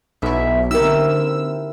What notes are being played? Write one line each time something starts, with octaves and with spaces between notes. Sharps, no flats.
B1 E4 E5
D3 C4 D#4 E4 G4 A#4 E6